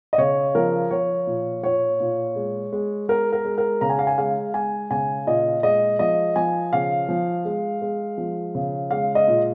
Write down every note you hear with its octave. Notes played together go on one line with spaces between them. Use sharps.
D#5
C#3 C#5
F3 A#4
F3 C#5
A#2
A#2 C#5
A#2
G#3
G#3
G#3 A#4
A#4
G#3
A#4
C#3 A#5
G#5
F5
G#5
G#3 F5
G#3 G#5
C#3 G#5
A#2 D#5
G#3 D#5
F3 D#5
F3 G#5
C#3 F5
F3
G#3
G#3
F3
C#3
G#3 F5
D#5
A#2